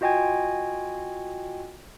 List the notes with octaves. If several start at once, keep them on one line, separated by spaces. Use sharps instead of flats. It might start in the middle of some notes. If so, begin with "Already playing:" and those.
F4 F#4 D#5 G5 G#5 G#6